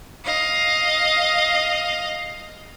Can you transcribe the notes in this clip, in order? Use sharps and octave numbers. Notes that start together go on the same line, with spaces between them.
D#5 F5